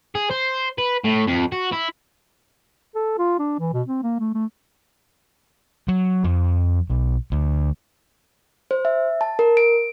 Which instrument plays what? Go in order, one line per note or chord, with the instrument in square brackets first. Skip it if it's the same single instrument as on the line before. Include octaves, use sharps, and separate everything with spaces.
[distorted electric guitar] G#4
C5
B4
A2
F2
F#4
E4
[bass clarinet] A4
F4
D4
E3
B2
C4
A#3
A3
A3
[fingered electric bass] F#3
F2
B1
D2
[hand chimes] C5
E5
A5
A#4
D7